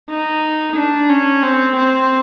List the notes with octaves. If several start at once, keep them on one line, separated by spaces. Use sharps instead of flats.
D#4
D4
C#4
C4
C4